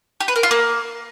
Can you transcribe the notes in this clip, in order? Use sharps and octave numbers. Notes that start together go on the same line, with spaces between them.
G4
B4
A#4
F4
A#3